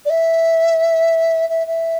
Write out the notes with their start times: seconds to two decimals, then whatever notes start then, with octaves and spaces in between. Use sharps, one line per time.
0.05 D5
0.09 E5
1.49 E5
1.66 E5